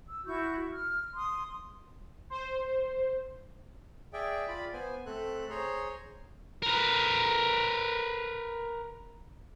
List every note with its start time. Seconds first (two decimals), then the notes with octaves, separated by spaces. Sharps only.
0.09 E6
0.26 E4 F#4 C#6 G6
0.71 F6
1.14 C6 D#6
2.30 C5
4.13 G#4 D5 E5 G5
4.48 F4 D5 B5
4.73 B3 C5 G#5
5.06 A3 C4 A4 F#6
5.50 G#4 C5 C#5 A#5 C6
6.62 A#4 B4